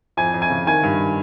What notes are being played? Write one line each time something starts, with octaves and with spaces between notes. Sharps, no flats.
F2 G#5
F2
G#5
C#3
D#3 G#5
G2